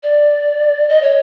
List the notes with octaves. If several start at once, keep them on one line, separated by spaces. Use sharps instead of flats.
D5
D#5
C#5